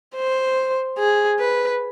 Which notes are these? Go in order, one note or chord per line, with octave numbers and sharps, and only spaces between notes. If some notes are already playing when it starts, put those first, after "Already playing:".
C5
G#4
B4